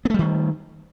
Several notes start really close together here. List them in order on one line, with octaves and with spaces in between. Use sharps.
B3 A3 G3 D#3